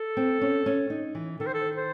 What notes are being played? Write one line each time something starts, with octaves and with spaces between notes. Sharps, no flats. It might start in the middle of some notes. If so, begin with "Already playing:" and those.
Already playing: A4
C4
C#4
C#4
D#4
E3
D#3 A4
C5
A4
C5